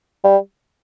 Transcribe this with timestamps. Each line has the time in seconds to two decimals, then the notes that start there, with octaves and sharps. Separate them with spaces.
0.24 G3